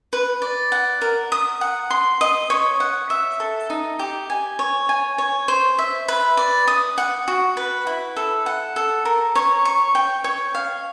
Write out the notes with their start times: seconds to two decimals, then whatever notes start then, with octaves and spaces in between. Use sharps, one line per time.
0.13 B4
0.42 D5
0.72 F#5
1.01 A#4
1.32 D#6
1.61 F#5
1.90 C6
2.21 D#5
2.50 C#5
2.80 F#5
3.10 E5
3.40 A4
3.70 D#4
3.99 G4
4.30 G#5
4.59 C#5
4.89 G#5
5.18 C#5
5.48 C5
5.78 E5
6.08 B4
6.37 D5
6.67 D#6
6.98 F#5
7.28 F#4
7.57 B4
7.87 E4
8.16 A4
8.46 F#5
8.76 A4
9.05 A#4
9.35 C#5
9.65 C#6
9.95 G5
10.24 C#5
10.55 F5